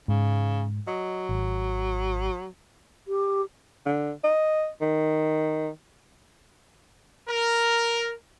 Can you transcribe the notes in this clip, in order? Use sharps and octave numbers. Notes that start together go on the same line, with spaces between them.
G#2 C#3
F#3 D#5
G#1
G4
D3
D#5
D#3
A#4